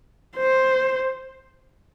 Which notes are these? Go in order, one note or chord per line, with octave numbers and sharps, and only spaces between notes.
C5